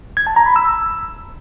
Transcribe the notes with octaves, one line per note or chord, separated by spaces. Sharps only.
G#6
A5
A#5
B5
E6